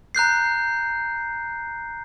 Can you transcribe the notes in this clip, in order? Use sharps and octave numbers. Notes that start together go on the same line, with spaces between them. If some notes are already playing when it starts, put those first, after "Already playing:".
A#5 F#6 G6 C7